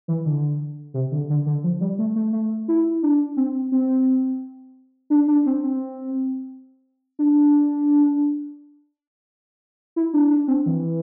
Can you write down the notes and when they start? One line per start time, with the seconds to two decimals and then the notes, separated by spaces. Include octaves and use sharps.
0.08 E3
0.26 D3
0.94 C3
1.12 D3
1.30 D3
1.46 D3
1.64 F3
1.81 G3
1.99 A3
2.16 A3
2.33 A3
2.68 E4
3.03 D4
3.37 C4
3.72 C4
5.10 D4
5.28 D4
5.46 C4
5.63 C4
7.19 D4
9.96 E4
10.13 D4
10.30 D4
10.48 C4
10.66 E3